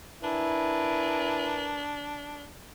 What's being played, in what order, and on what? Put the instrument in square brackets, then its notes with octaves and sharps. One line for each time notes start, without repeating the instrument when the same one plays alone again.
[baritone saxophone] D4 [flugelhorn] E4 [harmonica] A#4 B4 G#5